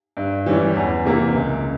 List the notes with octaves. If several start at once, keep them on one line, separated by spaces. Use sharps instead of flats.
G2
E3 G3 C#4
E2
C3 E3 A#3
C#2